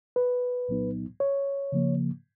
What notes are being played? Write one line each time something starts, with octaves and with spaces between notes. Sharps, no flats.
B4
C2 A#2 F#3 B3 D#4
C#5
C#3 F3 A#3